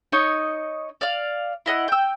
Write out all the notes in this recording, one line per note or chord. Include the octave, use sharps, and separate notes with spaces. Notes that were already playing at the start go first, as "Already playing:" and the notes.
D#4 C#5 D#5
D5 F5
E4 D#5 F#5
G5 E6